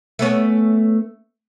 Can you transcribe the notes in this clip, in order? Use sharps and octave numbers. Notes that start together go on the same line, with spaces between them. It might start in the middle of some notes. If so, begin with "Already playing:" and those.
A3 B3 C#4